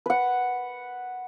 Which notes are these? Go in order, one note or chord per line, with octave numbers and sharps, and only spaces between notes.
B4 F#5